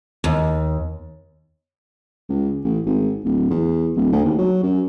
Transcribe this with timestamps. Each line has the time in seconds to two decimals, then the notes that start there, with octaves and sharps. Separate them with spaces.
0.24 D#2
2.29 C#2
2.64 A1
2.86 G#1
3.25 D1
3.50 E2
3.96 D1
4.12 D2
4.25 D#2
4.39 F#3
4.63 F#2